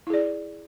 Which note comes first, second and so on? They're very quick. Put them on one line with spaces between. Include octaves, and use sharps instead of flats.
E4 G#4 D5